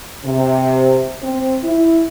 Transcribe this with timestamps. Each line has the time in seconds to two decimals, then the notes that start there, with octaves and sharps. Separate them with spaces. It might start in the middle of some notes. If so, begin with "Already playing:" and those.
0.25 C3
1.21 C4
1.63 E4